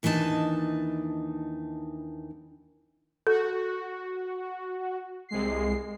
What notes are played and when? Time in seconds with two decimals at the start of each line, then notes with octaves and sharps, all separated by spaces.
0.03 D#2 E3 D4 D#4 A5
3.27 F#4 A4
5.29 C2 G#3 C7